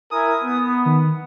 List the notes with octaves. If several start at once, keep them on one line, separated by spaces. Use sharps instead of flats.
E4 A#4 G#5 D#6
B3
D#3